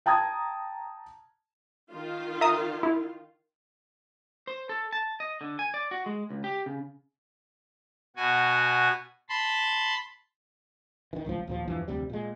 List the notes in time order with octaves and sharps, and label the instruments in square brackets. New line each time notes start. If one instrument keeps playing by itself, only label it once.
[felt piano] G5 A5 A#5 D#6 G#6
[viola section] D#3 F4
[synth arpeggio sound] E5 A#5 D#6
E4
[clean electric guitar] C5
A4
A5
D#5
D3
G#5
D5
F#4
G#3
C#2
G4
C#3
[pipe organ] B2 F#4 G#5
A5 B5 C6
[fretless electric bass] D#3 E3
D1 G#1 C#2 F3
D#2 A#2 F3
E2 G2 E3 F3
F1 D2 C3 G3
A#2 G#3